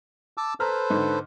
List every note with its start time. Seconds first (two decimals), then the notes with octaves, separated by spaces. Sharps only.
0.37 A5 D6 E6
0.60 A4 B4 C5 A#5 B5 F6
0.90 G#2 D3